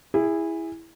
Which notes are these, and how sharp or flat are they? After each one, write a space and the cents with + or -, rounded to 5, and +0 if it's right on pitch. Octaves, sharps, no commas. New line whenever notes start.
E4 +0 G#4 -20